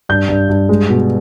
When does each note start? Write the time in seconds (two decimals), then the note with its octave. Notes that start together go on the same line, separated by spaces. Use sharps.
0.09 G2 G6
0.29 G2
0.49 G2
0.69 G#3
0.89 B2